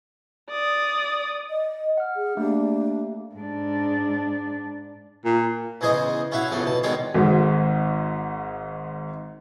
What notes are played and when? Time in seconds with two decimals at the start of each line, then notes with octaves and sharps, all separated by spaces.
0.51 D5 D#6
1.49 D#5
1.97 F#5 F6
2.16 G#4
2.37 A3 A#3 D4 G4
3.35 G#2 D4
5.25 A#2
5.81 E2 C#3 G#4 C5 D#5
6.32 C#4 E4 F#4 E5 F5
6.51 E2 C#3 F3 A4
6.64 B2 A5
6.83 B2 D#3 G#3 C#5 D5 C6
7.14 G#1 G#2